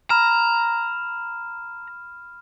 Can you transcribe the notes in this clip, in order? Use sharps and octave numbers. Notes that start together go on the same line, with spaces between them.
A#5 B5 F6 E7